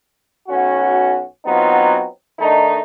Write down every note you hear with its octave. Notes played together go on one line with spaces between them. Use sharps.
B1 C#4 F#4
F#3 B3 C4 D#4 F4
D#3 A3 D4 D#4